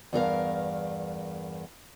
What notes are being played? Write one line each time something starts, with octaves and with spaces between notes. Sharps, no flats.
E2 G2 A#4 F5